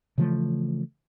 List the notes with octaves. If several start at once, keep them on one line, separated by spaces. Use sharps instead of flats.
C#3 E3 F3 A3